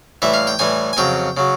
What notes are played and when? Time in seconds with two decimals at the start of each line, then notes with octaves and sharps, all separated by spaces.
0.22 A2 E3 G3 E5
0.34 F5
0.47 G5
0.59 A2 E3 G3 G#5
0.93 G#5
0.97 F2 C#3 F#3 G5
1.37 C#3 F#3